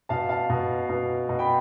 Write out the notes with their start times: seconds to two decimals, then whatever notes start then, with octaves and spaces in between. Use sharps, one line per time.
0.09 B2 F5 A5
0.29 F5 A5
0.50 B2
0.89 B2
1.29 B2
1.39 G5 B5